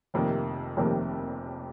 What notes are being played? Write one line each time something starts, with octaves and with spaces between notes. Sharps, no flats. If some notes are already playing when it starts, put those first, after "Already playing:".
F1 F2 C3 D#3 A#3
F1 F2 C3 D#3 A#3